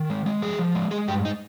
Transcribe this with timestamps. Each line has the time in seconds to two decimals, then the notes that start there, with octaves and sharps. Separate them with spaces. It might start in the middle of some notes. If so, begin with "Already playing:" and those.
Already playing: D#3
0.10 G#3
0.26 G#3
0.42 F3 G#4
0.59 F3
0.75 G#3
0.91 G#3 G#4
1.08 G2 G4
1.25 D#4